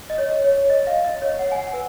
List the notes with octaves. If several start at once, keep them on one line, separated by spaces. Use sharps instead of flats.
D#5
C#5
C#5
D#5
F5
D#5
C#5
F#5
G#5
F#5
B4